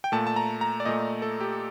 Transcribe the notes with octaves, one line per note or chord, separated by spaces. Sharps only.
G5
A#2 A3 A5
A5
A#5
A#5
D5
A#2 A3 D#5
A4
G4